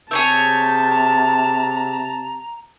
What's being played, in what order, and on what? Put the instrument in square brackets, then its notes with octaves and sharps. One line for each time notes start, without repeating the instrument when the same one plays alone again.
[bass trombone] C3 [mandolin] G#4 C#5 E5 [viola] A5 [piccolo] G6
[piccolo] A#5